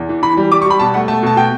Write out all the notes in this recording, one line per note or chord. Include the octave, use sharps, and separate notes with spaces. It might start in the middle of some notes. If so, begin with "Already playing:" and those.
Already playing: E2
E3
E3 B5
G3
G3 D6
C#6
G3 B5
B2 A5
A3 F#5
A3 A5
B2 A5
B2 G5